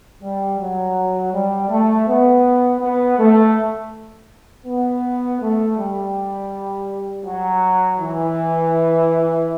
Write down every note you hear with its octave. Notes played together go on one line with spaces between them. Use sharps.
G3
F#3
G3
A3
B3
B3
A3
B3
A3
G3
F#3
E3